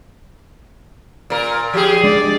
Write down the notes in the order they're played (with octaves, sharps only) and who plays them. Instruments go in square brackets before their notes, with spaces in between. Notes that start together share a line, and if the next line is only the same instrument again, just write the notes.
[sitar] A#2 A#4
[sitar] F3 G#4 [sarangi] G4
[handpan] G#3 D4 [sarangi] D5